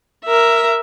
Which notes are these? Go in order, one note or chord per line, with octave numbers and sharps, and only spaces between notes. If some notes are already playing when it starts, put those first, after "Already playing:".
A#4 E5